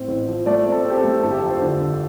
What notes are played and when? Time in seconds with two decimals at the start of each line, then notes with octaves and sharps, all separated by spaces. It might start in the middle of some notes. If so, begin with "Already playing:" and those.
Already playing: A2 C4
0.08 A1
0.28 F3
0.46 A3 D5
0.67 C4
0.72 A4
0.85 C4
0.90 G4
0.98 A4
1.04 A3
1.23 G1 A4
1.31 G4
1.39 A4
1.43 F2
1.50 C5
1.61 D3
1.81 G1